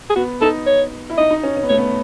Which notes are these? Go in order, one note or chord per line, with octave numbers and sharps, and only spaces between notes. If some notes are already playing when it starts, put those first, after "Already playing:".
G#4
B3 F#4
D#4 A4
C#5
E4
D#4 D#5
D#4
C#4
C#4
B3
A3 C#5
B3